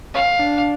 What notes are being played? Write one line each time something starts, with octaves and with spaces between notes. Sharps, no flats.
C#4 F5
D4